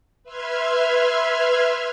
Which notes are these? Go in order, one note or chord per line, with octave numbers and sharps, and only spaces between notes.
B4 E5 C6 F6 G#6